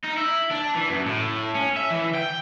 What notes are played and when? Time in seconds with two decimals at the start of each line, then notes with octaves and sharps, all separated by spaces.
0.04 D#4
0.17 E4
0.51 D4
0.75 E3
0.89 F#2
1.06 A2
1.55 C#4
1.77 E5
1.91 E3
2.15 G5